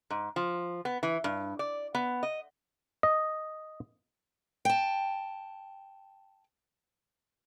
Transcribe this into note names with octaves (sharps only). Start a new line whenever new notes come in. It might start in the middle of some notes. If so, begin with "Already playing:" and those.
G#2
F3
B3
E3
G2
D5
B3
D#5
D#5
G5 A5